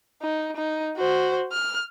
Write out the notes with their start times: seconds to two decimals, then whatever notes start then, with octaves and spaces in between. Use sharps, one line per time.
0.22 D#4
0.56 D#4
0.97 F#4 C5
1.52 F6